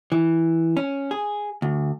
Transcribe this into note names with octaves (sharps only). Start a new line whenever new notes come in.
E3
C#4
G#4
D2